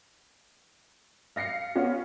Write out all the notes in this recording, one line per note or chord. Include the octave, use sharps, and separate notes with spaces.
F5 A#6 C7 C#7
B3 C#4 F4